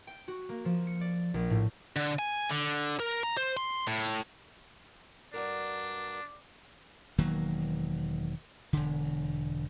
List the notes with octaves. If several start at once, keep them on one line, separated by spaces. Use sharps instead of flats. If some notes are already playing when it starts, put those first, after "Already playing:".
G5
F#4
A#3
F3
C#7
D5
A#1
A2
D3
G#5
D3
A#4
A#5
C5
C6
A2
G2 D4 F#4 A#4 D5
E1 D#3 F#3 A#3
E1 D3